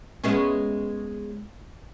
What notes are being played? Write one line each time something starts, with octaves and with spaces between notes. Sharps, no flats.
G#3 B3 C#4